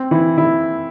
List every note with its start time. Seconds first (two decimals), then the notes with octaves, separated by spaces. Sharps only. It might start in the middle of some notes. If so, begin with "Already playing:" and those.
Already playing: C4
0.11 E3 E4
0.38 E3 E4